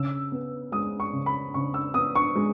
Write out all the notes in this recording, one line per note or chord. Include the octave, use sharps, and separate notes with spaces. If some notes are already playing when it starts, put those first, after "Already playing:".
Already playing: C#3 E6
B3
G#3 D#6
C#6
C#3
B5
C#3 C#6
E6
B3 D#6
C#6
G#3